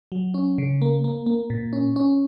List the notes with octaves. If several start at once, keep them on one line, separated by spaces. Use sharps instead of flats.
F#3
C#4
C#3
A#3
A#3
A#3
A#2
C#4
C#4